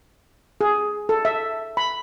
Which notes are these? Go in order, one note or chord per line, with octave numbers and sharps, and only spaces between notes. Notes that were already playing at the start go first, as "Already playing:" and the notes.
G#4
A4
E5
B5